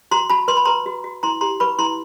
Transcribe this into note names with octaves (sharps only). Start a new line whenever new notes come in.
F#4 A#5 C6
F#4 A5 B5
B4 C6
B5
B4 A#5 C6
F#4
F#4
E4 A#5 C6
G4 A#5 C6
B4 B5 C#6
E4 A#5 C6